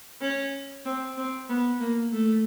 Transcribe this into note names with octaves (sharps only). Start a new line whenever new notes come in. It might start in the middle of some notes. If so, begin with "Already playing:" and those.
C#4
C4
C4
B3
A#3
A3